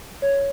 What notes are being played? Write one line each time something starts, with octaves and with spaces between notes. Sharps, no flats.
C#5